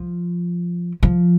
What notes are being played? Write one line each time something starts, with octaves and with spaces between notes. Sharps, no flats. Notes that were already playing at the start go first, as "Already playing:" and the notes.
Already playing: F3
F3